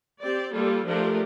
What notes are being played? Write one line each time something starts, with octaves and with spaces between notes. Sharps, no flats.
C4 G4 D5
G3 A#3 F4 A4
F3 A3 D4 G4 A#4